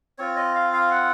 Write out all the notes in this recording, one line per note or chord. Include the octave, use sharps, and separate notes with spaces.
C4 F4 C#5
D#5
F5
F5
F#5